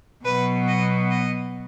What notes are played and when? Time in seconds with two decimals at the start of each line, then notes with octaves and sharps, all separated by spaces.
0.25 B2 F#3 B3 B4
0.68 D#5
1.11 D#5